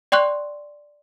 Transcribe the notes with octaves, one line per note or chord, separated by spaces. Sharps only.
D5 G5 C6 C#6 F#6